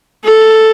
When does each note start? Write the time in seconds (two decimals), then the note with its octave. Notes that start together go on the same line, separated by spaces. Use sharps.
0.24 A4